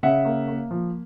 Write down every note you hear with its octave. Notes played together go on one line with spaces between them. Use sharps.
C#3 E5 F#5
A#3
A#3
F3